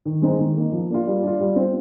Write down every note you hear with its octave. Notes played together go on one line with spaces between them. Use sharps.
D#3
G#3 C4 D#4
D#3
A#3 D#4
F3
A#3 D4 F4
G3
D4 F4
G3
C4 F4